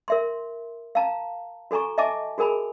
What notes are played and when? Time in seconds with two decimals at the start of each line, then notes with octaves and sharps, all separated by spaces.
0.08 A#4 E5 C6
0.95 F5 A5 A#5
1.71 F#4 A4 G#5 A#5 C#6
1.98 D#5 E5 G#5 A5 D6
2.38 F#4 G#4 A#4 G#5 B5